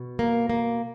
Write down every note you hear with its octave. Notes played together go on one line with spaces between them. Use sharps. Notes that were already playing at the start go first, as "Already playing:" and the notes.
Already playing: B2
A#3
A#3